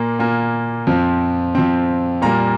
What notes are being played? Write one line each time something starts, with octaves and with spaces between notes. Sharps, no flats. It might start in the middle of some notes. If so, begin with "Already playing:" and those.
Already playing: A#2 A#3
A#2 A#3
F2 F3 C4
F2 F3 C4
A#2 G3 A#3 A#5